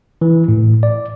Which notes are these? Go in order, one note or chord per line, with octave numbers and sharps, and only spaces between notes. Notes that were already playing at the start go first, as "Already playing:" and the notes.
E3
A2
D5